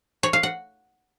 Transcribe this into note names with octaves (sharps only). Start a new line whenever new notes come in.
C#5
F5
F#5